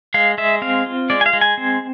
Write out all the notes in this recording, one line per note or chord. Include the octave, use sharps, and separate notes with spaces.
G#3 F5
G#3 E5
C4 F5
F4
G#3 D5
G#5
F5
G#3
G#5
C4